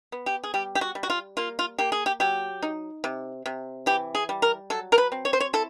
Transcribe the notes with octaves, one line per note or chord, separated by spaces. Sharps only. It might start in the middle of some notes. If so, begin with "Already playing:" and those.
B3
G4
G#4
G3 G4
G4
F#4
G3
F#4
F4
A#3 F4
F4
A#3 G4
G#4
G4
F#3 G4
D#4
C3
C3
E3 G4
G#4
G3
A#4
F#3 A4
A#4
B4
C4
C#5
C5
C#5
E4 A4